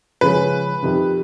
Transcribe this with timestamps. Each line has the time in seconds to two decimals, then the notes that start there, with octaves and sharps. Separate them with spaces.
0.21 C#3 F3 G#3 C#4 B4
0.83 F2 C3 D#3